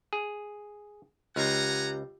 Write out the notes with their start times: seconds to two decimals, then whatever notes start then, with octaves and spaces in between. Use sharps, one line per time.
0.13 G#4
1.36 C#2 F4 G4 F#5 G#5 A#5 G6